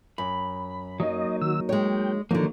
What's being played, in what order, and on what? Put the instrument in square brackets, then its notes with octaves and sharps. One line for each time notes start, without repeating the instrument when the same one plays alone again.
[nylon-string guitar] F#2 [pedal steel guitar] B5
[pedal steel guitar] F#3 A#3 D#4 [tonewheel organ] D#5
[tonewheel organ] D#3 F#4 E6
[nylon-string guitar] G#3 C#5 [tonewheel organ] G5
[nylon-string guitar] D3 D#4 [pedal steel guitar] D#3 F#3 A#3 [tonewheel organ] F3